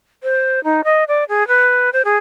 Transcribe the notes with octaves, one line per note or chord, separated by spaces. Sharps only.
C5
D#4
D#5
D5
G#4
B4
C5
G#4